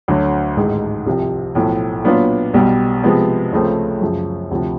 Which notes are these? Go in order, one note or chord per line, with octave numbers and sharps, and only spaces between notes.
D2 D3 F#3
A1 G#2 D#3 G#3
C2 C3 F3
B1 A2 F3 A3
A#2 F#3 B3 D4 F4
B1 B2 G3
C3 F3 G#3 B3
C#2 C#3 F3 A3 C4
F#2 C#3 F3
D2 C3 F3